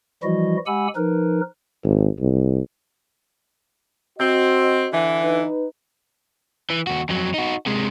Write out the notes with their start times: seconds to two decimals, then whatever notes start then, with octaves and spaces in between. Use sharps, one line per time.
0.23 E3 F3 G3 E4 F#4 D#5
0.67 G#3 G4 F#5 G#5 B5 E6
0.96 F3 D#4 A#4 B4
1.83 G#1
2.20 C2
4.19 C4 F#4 D#5
4.92 D3 E3
5.22 D#4 B4
6.70 E3
6.87 D#2 F#4
7.09 F2 F#3
7.34 D#4 F#4
7.66 C3 G#3